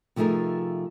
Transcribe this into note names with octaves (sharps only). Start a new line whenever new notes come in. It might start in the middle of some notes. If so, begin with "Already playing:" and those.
C3 F3 A3 D#4 G#4 A#4